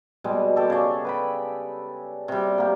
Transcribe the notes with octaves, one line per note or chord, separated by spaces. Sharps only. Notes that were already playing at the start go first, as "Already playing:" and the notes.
B2 G3 G#3
G4 A4 D5
C#3 D5
B4 G5 B5
C3 G3
A#3 G4